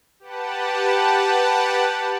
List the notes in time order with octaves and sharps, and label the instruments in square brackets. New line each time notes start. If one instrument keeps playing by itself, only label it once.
[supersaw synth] G4 B4 F#5 A5